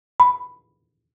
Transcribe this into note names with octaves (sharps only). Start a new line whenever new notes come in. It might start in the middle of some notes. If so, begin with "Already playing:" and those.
B5